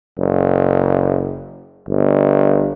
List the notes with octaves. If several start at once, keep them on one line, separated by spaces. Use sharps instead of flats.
F#1
G1